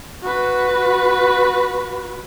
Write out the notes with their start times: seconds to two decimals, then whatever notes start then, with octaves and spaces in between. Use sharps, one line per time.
0.23 F#4 B4